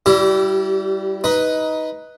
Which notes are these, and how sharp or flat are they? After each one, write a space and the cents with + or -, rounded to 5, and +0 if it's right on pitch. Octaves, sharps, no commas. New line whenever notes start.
G3 -15 E4 +15 G4 -40
D#4 +15 B4 +0